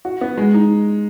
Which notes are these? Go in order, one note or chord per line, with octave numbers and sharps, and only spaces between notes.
F#4
B3
G#3
D#4